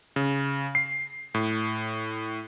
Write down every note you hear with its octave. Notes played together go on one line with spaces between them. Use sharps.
C#3
C7
A2